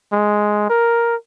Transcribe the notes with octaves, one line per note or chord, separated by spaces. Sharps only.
G#3
A#4